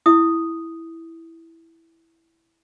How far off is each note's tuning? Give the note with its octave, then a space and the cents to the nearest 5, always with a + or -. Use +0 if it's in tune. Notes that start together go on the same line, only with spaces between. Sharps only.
E4 +0 D#6 +0